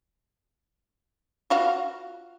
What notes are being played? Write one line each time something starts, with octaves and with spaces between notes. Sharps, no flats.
F4 F#4 F5